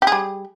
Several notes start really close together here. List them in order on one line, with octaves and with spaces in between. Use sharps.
G4 G#4 G3